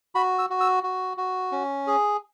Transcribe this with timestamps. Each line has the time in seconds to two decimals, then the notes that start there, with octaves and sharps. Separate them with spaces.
0.15 F#4 B5
0.39 E6
0.50 F#4
0.61 E6
0.83 F#4
1.17 F#4
1.52 C#4
1.87 G#4